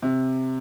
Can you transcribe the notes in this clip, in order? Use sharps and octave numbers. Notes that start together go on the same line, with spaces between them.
C3